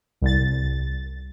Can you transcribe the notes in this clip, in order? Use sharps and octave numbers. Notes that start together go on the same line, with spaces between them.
C2 A6